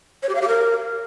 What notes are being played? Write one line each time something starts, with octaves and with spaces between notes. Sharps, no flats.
C#5
G4
F5
G4
A#4